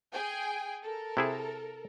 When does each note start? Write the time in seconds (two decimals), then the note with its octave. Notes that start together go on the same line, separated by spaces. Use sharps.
0.13 G#4 G5 G#5
0.82 A4 A#4
1.17 C3 E4 G#4